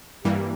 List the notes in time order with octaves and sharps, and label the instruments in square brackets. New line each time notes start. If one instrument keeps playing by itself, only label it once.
[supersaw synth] G2 E3 G3 A#3 [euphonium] G4